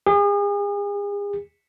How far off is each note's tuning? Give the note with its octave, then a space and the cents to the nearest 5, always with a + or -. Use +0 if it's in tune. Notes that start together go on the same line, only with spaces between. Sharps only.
G#4 -40